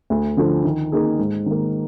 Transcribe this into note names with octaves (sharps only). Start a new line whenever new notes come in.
D2
D3 F3
D#3
A#3 D#4 G#4
G#2
D#3 A#3